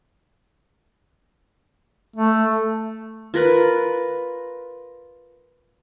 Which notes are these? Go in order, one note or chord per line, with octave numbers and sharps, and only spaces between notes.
A3
F4 A#4 B4